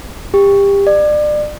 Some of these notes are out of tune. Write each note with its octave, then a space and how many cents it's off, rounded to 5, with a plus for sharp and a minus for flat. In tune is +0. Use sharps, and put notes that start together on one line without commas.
G4 +25
D5 +30